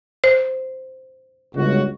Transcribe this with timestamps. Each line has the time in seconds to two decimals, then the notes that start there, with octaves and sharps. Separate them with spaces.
0.24 C5
1.55 G1 C#2 F#4